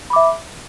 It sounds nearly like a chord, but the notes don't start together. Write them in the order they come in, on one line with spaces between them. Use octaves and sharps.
B5 D6 E5